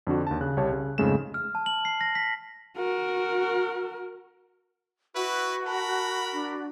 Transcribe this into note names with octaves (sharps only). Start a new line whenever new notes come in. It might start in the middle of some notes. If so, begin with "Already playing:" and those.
F2 D3 D4 F#4
D#2 A5
C#3 F#6
C2 G4 C#5 A5
C#3
F2 G#2 C#3 G#3 A3 E7
F6
A5
F#7
C7
A#6
B6
F#4 A#4
E4 F#4 B4 C#6
A#4 A5 B5
D4